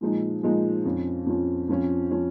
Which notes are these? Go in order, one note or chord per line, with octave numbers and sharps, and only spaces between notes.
A#2 F3 G#3 D#4
A#2 F3 G#3 D#4
F2 F3 C#4
F2 F3 C#4
F2 F3 C#4
F3 C#4